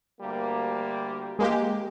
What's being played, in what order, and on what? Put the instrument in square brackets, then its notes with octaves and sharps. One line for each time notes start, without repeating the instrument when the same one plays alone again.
[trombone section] D2 G3 A#3
[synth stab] G#3 A#3 G4